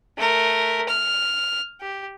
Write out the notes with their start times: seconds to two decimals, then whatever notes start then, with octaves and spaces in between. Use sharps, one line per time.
0.18 A3 A#4
0.88 F6
1.81 G4